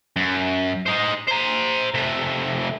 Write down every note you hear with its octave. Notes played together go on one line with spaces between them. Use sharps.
F#2
D#4 C5
C5 A#5
C3 A3